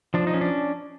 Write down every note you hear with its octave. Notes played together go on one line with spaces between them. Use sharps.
F3 D4
D#4
C#4
D4